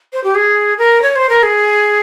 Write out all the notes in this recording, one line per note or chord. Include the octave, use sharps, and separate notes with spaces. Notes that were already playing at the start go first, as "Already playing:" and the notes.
C5
G4
G#4
A#4
C#5
C5
A#4
G#4